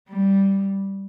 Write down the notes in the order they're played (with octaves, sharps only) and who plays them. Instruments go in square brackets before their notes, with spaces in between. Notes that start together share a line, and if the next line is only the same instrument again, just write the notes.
[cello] G3